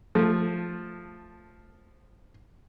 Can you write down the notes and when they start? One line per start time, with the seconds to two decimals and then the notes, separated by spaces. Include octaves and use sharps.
0.15 F3 A3